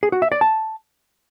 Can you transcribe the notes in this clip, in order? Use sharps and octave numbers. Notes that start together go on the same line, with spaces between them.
G#4
F#4
E5
D5
A5